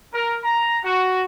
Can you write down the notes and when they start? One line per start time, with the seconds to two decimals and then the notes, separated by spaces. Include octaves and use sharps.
0.14 A#4
0.44 A#5
0.84 F#4